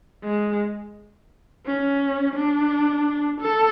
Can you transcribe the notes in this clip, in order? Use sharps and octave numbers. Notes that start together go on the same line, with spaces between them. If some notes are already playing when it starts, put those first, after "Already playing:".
G#3
C#4
D4
A4